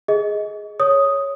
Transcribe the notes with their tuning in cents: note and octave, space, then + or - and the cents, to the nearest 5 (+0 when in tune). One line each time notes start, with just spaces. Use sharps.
G#4 +0 D#5 +20
C#5 +0 D#6 +0